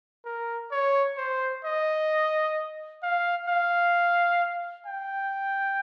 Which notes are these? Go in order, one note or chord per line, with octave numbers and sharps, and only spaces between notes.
A#4
C#5
C5
D#5
F5
F5
G5